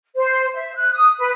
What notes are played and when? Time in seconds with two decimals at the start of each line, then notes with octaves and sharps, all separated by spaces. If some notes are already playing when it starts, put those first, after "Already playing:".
0.16 C5
0.55 E5
0.76 F#6
0.92 D#6
1.19 B4